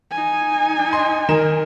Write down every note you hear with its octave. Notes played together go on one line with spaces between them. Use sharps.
D#4 G#5
D#5 C6
D#3 A#4 E7